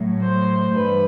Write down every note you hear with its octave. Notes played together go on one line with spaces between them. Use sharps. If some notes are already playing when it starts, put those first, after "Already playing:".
Already playing: A2 F#3
C5
G2 E3 G3 B4